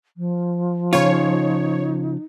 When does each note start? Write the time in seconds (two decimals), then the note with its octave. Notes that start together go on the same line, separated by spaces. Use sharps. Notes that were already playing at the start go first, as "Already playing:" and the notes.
0.17 F3
0.93 C#3 D#4 F4 C#5